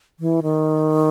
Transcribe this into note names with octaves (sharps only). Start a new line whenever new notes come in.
E3
D#3